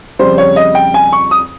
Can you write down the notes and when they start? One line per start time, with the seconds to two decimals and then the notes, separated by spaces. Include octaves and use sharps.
0.19 F2 C#3 G3 C5
0.38 C#5
0.56 D#5
0.75 G5
0.94 G#5
1.13 C#6
1.31 D#6